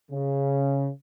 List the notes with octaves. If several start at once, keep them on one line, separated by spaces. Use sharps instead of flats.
C#3